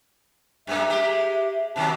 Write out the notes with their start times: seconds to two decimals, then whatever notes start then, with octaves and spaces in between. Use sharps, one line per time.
0.67 F#2 G#3 A#3 E5
0.90 G#3 G4
1.76 B2 D#3 F#3 A5